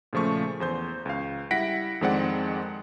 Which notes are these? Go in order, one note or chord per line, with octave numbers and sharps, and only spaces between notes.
A#2 C#3 F3 A3 C#6
E2 C5 G6
C#2 F5
G3 E4 F#5 A#6 B6 D7
F2 D#3 G#3 C4 D5 F#5